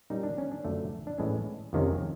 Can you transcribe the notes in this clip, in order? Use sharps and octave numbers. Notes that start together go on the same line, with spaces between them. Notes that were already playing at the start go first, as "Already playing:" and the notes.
A#2 G3 A#3 C#4 D#4
D4
C#4
D4
F#2 D3 F3 A3
D4
A2 E3 G#3 C#4
F2 C3 D#3 G#3 C#4